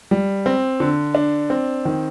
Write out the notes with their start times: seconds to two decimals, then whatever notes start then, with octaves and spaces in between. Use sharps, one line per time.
0.11 G3
0.46 C4
0.80 D3
1.15 D4
1.50 C4
1.85 D#3